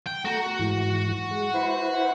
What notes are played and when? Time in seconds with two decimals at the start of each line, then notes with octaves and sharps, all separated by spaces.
0.07 G5
0.25 A3 F#4 A#5
0.59 G#2 E3
1.31 G#3
1.54 E4 B4 C5